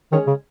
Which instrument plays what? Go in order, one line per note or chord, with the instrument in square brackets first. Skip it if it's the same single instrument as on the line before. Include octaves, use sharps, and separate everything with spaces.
[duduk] D#3 [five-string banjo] G#3 C#4 G#4 C#5
[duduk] C#3